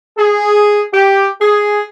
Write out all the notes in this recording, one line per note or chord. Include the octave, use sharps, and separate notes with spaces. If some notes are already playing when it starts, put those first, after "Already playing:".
G#4
G4
G#4